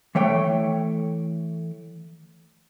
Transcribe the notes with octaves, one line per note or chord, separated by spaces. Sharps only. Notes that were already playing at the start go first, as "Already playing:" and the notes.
E3 A3 C#5 G5